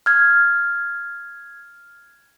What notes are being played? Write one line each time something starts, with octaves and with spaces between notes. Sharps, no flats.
F6 G#6